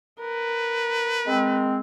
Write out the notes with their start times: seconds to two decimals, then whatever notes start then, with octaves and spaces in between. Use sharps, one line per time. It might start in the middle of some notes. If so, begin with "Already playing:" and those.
0.20 A#4 B4
1.27 G#3 C4